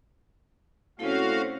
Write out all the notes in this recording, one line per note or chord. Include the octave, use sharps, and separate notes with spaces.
C3 A3 C4 C#4 E4 F#4 A4 F5